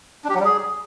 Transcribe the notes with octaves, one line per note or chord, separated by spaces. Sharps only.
D4
G4
F#3
G3
G#4